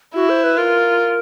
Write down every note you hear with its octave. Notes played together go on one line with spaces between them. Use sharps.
E4 F#4
C5
B4
F4 A#4